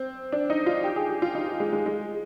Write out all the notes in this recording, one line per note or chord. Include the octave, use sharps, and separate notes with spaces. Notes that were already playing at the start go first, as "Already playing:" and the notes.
Already playing: C4
D4
D#4
F4
G4
G#4
G4
F4
D#4
G#3
G#3
G#3